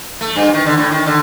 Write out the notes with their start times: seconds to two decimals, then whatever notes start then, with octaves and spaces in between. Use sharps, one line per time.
0.21 A3
0.36 G2
0.54 D#3
0.66 D3
0.77 A2
0.92 D#3
1.06 D3